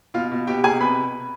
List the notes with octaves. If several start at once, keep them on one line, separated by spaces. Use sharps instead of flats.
B2 F4 F5
B2
B2 G4 G5
B2 G#4 G#5
C3 B4 B5